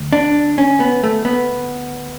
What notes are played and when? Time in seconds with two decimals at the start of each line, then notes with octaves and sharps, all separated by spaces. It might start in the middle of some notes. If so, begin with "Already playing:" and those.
Already playing: D2
0.13 D4
0.58 C#4
0.80 B3
1.04 A3
1.25 B3